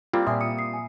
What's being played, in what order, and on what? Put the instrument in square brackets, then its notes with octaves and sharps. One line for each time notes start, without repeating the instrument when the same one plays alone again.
[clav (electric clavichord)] G3 A#3 C4 [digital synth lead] F4
[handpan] A#2 E5 [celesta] D5 G#5 D#6 [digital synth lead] C6
[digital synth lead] D#6 [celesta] C#7
[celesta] C7
G#5